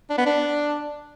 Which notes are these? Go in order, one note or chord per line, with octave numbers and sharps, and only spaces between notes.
D4
B3
D4